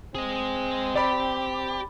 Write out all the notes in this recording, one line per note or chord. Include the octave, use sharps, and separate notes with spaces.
C4 G#4 D#5
G4 D5 B5